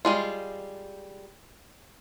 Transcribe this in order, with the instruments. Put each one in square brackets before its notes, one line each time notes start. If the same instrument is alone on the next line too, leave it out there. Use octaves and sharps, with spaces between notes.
[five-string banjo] G3 G#3 F4